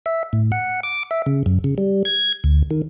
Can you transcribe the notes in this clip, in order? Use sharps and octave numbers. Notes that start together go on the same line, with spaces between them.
E5
A2
F#5
D6
E5
C#3
F#2
C#3
G3
G#6
D2
D#3